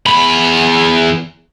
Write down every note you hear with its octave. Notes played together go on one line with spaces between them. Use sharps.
E2 B5